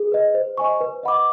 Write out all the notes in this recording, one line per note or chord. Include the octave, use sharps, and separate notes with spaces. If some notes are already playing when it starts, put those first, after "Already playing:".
Already playing: G#4
B4 D#5
C5
D#5 G#5 C#6
B4
D#5 F#5 B5 D6